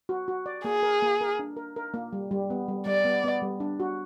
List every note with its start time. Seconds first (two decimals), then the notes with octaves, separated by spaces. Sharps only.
0.09 F#4
0.28 F#4
0.46 D5
0.65 A#3 G#4
0.83 A#4
1.02 A#3
1.21 A#4
1.39 D4
1.57 A#4
1.76 A#4
1.94 A#3
2.13 G3
2.31 G3
2.50 B3
2.68 G3
2.86 G3 D5
3.05 B3
3.24 B3
3.42 G3
3.60 D4
3.80 F#4